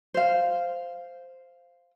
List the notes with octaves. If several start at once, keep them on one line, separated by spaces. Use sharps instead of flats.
C5 F5